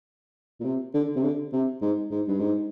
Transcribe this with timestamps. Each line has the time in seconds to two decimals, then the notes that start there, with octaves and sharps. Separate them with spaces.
0.60 A#2
0.64 C3
0.94 D3
1.16 C3
1.23 D3
1.53 C3
1.82 G#2
2.11 G#2
2.28 G2
2.39 G#2